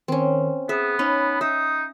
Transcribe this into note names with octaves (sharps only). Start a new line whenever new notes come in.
D#3 C4 C#4
B3 G#4 E5
C#4 D#4 B5
D#4 E5 D#6